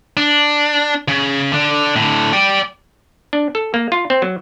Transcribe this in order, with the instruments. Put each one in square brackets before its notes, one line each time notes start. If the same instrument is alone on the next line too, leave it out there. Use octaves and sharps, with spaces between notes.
[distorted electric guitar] D4
C#3
D3 D4
A2 D3
D5 G5
[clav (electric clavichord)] D4
A4
A#3
F4
C4
F#3